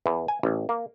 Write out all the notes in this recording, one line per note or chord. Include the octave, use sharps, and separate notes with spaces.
E2
G#5
A1
A#3